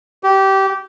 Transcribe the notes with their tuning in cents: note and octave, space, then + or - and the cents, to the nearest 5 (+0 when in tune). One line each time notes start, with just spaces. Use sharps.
G4 -20